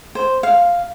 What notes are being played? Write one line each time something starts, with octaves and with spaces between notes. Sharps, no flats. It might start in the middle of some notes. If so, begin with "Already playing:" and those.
C5
F5